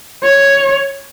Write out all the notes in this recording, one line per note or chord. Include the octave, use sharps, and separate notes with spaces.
C#5